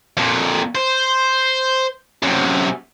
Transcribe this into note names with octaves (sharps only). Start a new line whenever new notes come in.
F2 A#2
C5
F#2 C3